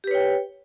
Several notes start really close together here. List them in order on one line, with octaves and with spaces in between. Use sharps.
G4 B4 C#5 G5